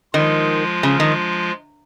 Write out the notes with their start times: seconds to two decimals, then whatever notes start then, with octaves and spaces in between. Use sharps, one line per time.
0.13 D#3 F3 G#3 F4
0.83 C#3
1.00 D#3